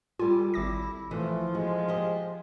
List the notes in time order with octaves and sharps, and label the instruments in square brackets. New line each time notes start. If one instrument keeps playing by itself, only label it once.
[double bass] G3 [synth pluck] F4 [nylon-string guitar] A4 G#5
[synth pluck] G#1 D6 A#6 [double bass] E4
[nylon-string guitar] E3 [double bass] F3 [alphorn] A3
[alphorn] G#3 [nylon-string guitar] F#4
[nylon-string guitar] G4 C5 D#5